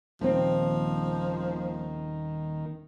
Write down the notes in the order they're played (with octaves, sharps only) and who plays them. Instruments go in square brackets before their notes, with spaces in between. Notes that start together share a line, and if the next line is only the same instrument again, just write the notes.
[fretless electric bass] D#1 A#2 C4 [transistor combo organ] D#3 [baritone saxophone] F3